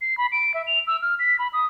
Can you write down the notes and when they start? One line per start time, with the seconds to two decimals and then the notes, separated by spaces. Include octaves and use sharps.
0.01 C7
0.18 B5
0.32 D7
0.54 E5
0.67 F7
0.87 E6
1.02 F6
1.19 B6
1.39 B5
1.53 D#6